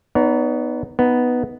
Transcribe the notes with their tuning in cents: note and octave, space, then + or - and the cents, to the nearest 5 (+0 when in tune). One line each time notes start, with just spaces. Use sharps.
B3 +0 D#4 -10 C#5 +40
B3 +0 D#4 +0